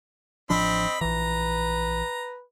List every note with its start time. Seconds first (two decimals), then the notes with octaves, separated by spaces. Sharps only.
0.50 A1 F3 C4 D4 D#5 B5
1.01 A#1 E3 B4 A#5